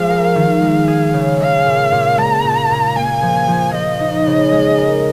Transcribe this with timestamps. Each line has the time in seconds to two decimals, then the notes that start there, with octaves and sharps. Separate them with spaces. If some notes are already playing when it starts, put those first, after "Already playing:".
Already playing: F3 G#3 F5
0.10 A#4
0.35 D#3
0.62 G#3
0.88 G#4
1.14 C#3
1.40 G#3 F5
1.66 A#2
1.92 A#2
2.18 G#3 A#5
2.44 A#2
2.70 A#2
2.96 A#3 G#5
3.22 F3
3.48 F3
3.74 F3 D#5
4.00 D#4
4.27 C#3
4.52 G#3
4.78 A#4